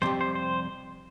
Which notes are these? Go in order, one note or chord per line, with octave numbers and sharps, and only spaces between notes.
F2 C3 G3 C5
C5
C5